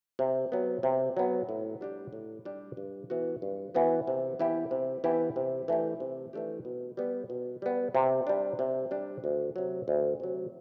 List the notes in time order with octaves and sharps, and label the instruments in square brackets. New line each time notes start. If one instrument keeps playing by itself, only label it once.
[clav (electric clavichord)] C3
F#3 B3
C3
F#3 B3
A2
G3 D4 G4
A2
G3 D4 G4
G2
E3 B3 F#4
G2
E3 B3 F#4
C3
E3 B3 E4 G4
C3
E3 B3 E4 G4
C3
E3 A3 D4 G4
C3
E3 A3 D4 G4
B2
G3 B3
B2
G3 B3
C3
G3 D4
C3
G3 D4
D2
C3 F#3
D2
C3 F#3